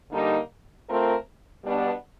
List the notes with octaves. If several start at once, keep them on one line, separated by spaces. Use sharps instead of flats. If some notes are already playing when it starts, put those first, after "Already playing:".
D3 G3 A#3 D#4
A3 C4 F4 A#4
B2 G3 B3 D4